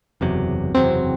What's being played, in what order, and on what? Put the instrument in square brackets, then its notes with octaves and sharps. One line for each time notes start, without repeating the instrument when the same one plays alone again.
[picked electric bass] F#1 E2 C3 F#3
[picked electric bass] F#1 E2 C3 F#3 [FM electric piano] C4